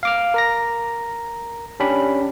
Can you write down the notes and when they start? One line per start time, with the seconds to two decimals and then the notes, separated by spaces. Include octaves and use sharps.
0.03 F5 D6 F6
0.34 A#4 A#5 A#6
1.80 C#4 D4 G4 B5